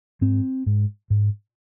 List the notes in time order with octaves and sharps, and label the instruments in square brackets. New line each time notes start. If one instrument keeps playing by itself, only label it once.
[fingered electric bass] G#2 C4
G#2
G#2